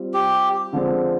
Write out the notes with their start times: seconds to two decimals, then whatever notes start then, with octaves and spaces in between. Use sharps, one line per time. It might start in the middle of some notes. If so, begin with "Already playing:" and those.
Already playing: G3 C4 F4
0.14 G4
0.73 D3 F3 G#3 C4